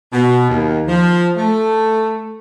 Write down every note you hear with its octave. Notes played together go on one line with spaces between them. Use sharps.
B2
D#2
F3
A3